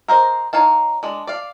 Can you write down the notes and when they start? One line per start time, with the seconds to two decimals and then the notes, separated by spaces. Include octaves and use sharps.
0.08 A#4 C5 D#5
0.53 D#4 C#5 F5 A5
1.03 G#3 D4
1.27 D5 F5